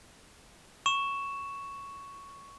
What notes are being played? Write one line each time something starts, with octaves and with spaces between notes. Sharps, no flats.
C#6 E7